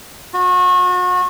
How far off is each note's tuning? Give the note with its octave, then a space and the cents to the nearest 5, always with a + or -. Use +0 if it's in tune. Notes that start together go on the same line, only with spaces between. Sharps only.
F#4 -35